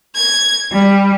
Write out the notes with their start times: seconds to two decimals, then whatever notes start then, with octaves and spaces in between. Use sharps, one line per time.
0.13 G#6
0.72 G3